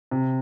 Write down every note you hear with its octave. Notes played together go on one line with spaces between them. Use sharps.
C3